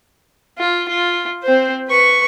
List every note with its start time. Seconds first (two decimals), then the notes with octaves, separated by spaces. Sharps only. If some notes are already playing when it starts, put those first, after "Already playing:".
0.58 F4
0.89 F4
1.43 C4 C5
1.89 B4 C#6